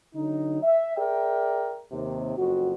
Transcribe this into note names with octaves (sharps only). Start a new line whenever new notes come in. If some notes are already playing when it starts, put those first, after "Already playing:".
D3 F#3 D#4
E5
G#4 A#4 D5 E5 G5
D#2 C3
F#1 F2 F#4